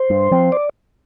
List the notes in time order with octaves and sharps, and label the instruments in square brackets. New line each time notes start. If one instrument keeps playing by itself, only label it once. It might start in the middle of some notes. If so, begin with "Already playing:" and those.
Already playing: [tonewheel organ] C5
[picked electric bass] G2
F3 C4
[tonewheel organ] D5